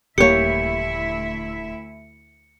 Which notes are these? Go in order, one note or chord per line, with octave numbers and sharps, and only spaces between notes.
D#1 D2 A#3 E4 G4 C#5 E5 C#7